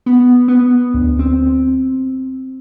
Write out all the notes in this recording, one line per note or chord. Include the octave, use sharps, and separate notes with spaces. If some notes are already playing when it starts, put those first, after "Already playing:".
B3
B3
D2
C4